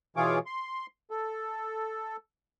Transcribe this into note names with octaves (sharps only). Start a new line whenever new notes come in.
B2 E3 F4 G#4 C#5 D6
C6
A4